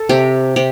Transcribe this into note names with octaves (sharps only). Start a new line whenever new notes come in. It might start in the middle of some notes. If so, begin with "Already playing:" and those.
Already playing: A4
C3 G4
C3 G4